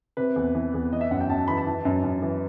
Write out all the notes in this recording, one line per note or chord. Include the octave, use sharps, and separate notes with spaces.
C3 B4
E2
E3
E2
E3 D#5
E5
F#2 F#5
G5
F#2 A5
E3 B5
A5
E3
F#2
F#2
E3